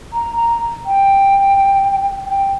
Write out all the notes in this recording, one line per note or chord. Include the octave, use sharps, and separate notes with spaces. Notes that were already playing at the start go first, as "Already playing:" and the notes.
A#5
A#5
G5
G5